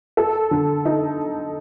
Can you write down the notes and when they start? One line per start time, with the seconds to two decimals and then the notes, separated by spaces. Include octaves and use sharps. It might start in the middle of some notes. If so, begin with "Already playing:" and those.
0.17 A4
0.51 D3
0.85 D#4